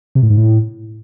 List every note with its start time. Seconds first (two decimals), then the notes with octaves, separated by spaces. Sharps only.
0.15 C3
0.23 A2
0.30 G#2
0.37 A2